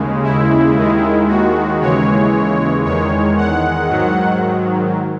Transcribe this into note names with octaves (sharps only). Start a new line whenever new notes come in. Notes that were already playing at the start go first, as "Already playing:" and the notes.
Already playing: D#2 C#3 G#3
E4
D#2 D#3 G#3
F#4
D#2 C#3 E3 G#3 C#5
E2 D#3 G#3 C#5
F#5
G#2 D#3 F#3